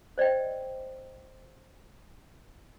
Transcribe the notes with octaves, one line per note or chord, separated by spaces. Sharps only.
C5 D5 D#5 G5